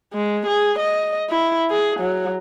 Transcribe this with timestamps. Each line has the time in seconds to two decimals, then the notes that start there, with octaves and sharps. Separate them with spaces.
0.13 G#3
0.47 G#4
0.79 D#5
1.29 E4
1.70 G#4
2.00 F#3